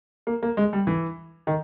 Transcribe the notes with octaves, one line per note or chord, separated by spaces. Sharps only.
A#3
A#3
G#3
G3
E3
D#3